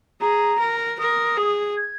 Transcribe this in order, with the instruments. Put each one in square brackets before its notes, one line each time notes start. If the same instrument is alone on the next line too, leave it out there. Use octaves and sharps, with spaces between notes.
[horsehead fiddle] G#4 [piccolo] A#5
[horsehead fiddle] A#4
[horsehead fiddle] A#4 [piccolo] D#6
[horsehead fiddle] G#4
[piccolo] G#6